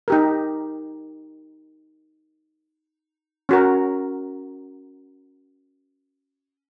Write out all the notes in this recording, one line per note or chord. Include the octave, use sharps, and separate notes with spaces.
D#4 G4 A#4
C#4 F#4 A#4